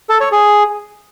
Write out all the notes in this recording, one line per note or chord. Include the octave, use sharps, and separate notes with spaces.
A4
C#5
G#4